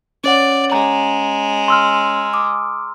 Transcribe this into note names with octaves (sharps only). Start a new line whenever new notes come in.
C#4 C#5 D5 F#5
G#3 A#5
C6 E6 F6
D6 D#6